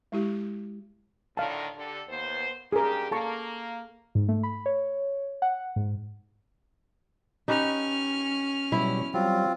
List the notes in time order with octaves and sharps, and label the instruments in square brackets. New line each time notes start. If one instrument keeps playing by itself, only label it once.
[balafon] G#3 E4 G4
[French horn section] A2 D3 D#3 [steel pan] F5 A5
[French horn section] D3 G4 A4
D#2 B3 C5
[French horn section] G2 G4 [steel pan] G#4 A#4
[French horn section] A#3 [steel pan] A4 A5 C#6
[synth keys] G#2
A3
B5
C#5
F#5
G#2
[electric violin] C#4 F6 [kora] D#4 G4 B4
[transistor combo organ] B2 F#3 G3 [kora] E4
[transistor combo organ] F#3 G3 [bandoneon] C4 F4